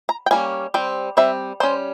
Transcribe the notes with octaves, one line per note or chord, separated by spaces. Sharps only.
A#5
G5
G3 A#3 C#4 G#5
G3 C4 G5
G3 C4 E5
G3 C#4 C5